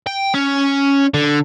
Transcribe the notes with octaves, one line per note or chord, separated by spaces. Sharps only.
G5
C#4
D3